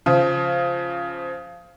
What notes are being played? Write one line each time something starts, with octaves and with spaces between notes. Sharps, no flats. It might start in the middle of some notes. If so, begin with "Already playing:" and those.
C#3 F3